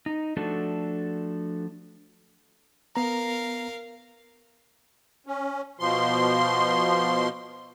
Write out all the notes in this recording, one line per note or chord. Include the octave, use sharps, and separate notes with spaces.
D#4
F3 A3 D4 F#4 A4
B3 A#4 F5 A#5
C#4
B2 F3 C6